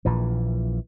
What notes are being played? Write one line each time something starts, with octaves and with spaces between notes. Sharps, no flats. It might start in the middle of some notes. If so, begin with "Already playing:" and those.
A#1 A#2 E3